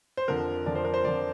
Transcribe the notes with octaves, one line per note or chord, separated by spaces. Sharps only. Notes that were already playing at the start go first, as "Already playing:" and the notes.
C5
F2 D3 F3 A#4
F2 D3 F3 D5
C5
A#4
C5
F2 D3 F3 D5